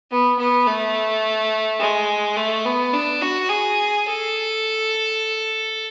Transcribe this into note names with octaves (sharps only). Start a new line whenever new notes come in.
B3
B3
A3
G#3
A3
B3
D4
F#4
G#4
A4